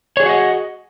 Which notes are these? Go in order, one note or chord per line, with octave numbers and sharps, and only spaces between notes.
F#4 G#4 C#5 D#5 F#5